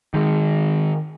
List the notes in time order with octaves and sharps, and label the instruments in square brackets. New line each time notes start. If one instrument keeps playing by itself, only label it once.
[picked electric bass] D#3 G#3